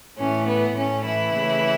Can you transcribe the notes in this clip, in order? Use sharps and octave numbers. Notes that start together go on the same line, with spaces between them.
A2 E3 A3 C#4
B3
A2 A3 C#4
E3 E4
C#3 A3